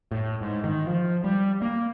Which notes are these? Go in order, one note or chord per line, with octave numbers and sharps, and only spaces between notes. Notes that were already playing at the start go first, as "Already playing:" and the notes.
A2
G#2
D#3
F3
G3
A#3